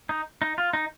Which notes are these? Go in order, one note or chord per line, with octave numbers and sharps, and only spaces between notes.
D#4
D#4
F4
D#4